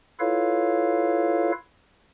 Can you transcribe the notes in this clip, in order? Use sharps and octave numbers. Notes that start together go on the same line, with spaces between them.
E4 F4 A4 B4 C#5 F5